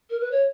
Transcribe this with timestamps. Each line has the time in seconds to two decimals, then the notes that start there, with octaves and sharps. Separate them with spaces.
0.10 A#4
0.20 B4
0.31 C#5